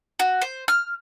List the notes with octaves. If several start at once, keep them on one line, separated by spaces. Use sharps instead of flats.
F#4
C5
F6